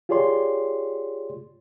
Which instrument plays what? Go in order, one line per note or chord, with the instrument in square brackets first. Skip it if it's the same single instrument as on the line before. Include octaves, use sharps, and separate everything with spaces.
[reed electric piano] F4 G4 G#4 C#5 D5 C6